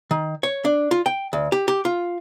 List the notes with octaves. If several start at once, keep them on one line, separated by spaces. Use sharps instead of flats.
D#3
C#5
D4
F4
G5
D2
G4
G4
F4